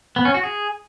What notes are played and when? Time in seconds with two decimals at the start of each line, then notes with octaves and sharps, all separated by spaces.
0.16 B3
0.25 C#4
0.34 F#4
0.43 G#4